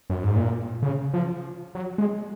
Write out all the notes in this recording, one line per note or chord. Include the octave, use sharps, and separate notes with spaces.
F#2
G#2
A#2
C#3
F3
F#3
G#3